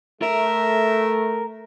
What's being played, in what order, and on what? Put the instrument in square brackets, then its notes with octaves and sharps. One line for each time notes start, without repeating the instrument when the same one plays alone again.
[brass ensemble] A3 [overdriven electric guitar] A#4 [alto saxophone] E5